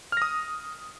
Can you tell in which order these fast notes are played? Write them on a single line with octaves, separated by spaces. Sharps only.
F6 A#6 D#6